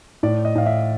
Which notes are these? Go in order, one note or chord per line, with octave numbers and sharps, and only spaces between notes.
A2 D5
D#5
A2 F5
E5